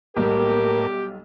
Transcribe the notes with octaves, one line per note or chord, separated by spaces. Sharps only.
B1 A2 G3 A#3 G4 A#4